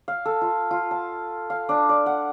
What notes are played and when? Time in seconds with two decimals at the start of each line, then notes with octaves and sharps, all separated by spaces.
0.08 F5
0.25 A4
0.41 F4
0.71 F4
0.91 A5
1.50 F5
1.69 D4
1.89 D5
2.06 F#5